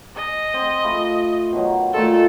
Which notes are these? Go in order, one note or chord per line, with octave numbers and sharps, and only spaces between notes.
D#5 G#5
C4 C5
A3 F4 B5
B2 D#3 F#3
A#2 D#3 A3 F4 A4